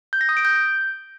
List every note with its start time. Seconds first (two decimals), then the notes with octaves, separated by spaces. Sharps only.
0.13 G6
0.21 A#6
0.29 D#6
0.37 D7
0.45 G6